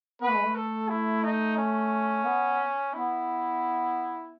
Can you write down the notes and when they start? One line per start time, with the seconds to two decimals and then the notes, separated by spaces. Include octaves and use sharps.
0.21 B3 B4
0.29 A3
0.37 G#3
0.45 A3
0.55 A4
0.89 E4
1.23 D#4
1.57 C#4
2.25 B3
2.93 B3 E4